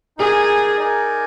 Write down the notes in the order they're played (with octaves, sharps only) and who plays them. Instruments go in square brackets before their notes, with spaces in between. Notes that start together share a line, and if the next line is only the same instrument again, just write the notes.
[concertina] D#4 A#4 D5 G#5 [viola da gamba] G#4
[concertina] D#4 A#4 D5 G#5